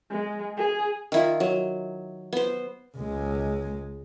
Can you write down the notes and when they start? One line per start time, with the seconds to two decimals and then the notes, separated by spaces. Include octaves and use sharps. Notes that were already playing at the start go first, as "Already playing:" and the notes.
0.11 G#3
0.57 G#4
1.12 D#3 E4 F4
1.40 F#3
2.33 B3 C5
2.97 C#2 G#3